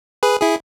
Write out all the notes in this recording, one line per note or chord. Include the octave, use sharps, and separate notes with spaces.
G#4 B4
E4 G#4